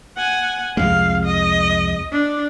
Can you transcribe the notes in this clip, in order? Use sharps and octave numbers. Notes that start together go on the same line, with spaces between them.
F#5 G#5
C2 F2 G#3 F5
D#5
D4